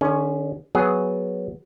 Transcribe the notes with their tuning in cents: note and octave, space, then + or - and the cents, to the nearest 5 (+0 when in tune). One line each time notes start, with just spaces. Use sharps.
D3 +45 C#4 +10 G#4 +0
F#3 +0 B3 +0 G#4 +0